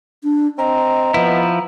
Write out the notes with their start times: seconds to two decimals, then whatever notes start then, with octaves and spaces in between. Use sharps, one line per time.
0.23 D4
0.59 C4 D#5 A#5
1.14 F3 B3 E4